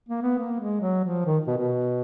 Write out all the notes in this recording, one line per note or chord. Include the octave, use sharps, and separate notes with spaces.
A#3
B3
A#3
G#3
F#3
F3
D#3
B2
B2